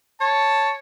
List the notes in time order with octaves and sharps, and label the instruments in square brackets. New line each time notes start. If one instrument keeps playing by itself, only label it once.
[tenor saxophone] C#5 [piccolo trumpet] A5